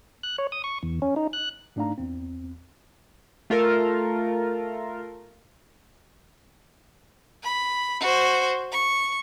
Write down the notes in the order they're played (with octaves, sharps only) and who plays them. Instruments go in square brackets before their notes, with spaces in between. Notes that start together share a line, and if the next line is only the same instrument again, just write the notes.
[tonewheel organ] F#6
C#5
D#6
C#6
E2
C#4
D#4
F#6
[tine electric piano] G#2 A3 D4 D#4 F5 A#5
E2 C4
[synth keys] A3 F4 A4 A#4
[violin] B5
F#4 C5
C#6